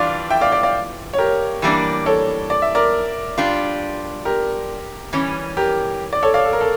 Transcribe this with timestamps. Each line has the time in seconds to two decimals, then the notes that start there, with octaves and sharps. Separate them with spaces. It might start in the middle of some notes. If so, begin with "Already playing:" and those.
Already playing: E3 G3 D4 F4 D5 F5
0.30 E5 G5
0.41 D5 F5
0.52 D5 F5
0.63 D5 F5
1.13 C#5
1.18 G4 A#4
1.62 E3 G3 A#3 D4
2.06 A4 C#5
2.50 D5
2.62 E5
2.75 A#4 D5
3.38 G3 D4 F4
4.25 G4 A#4
5.13 E3 G3 C#4
5.57 G4 A#4
6.13 D5
6.23 A4 C#5
6.34 D5 F5
6.45 A4
6.53 A#4
6.61 A4